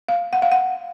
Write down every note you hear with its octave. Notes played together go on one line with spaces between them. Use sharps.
F5
F#5
F5
F#5